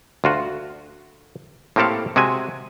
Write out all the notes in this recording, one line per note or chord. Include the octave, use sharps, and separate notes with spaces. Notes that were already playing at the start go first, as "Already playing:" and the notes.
D2 F4 F#4
A2 A#3 C4 G4 A4 F5
C3 G#3 F#4 E5 G#5